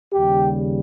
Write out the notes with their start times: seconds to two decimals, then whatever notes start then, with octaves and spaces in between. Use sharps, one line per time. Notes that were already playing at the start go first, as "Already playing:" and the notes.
0.13 D#2 C#3 G3 G4